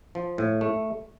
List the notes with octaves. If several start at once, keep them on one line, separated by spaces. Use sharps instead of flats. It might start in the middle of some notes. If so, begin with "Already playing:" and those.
F3
A2
A3